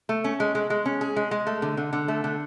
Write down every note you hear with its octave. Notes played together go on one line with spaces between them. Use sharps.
A3
C#4
G#3
G#3
G#3
C#4
G#4
G#3
G#3
A3
D3
D3
D3
A3
D3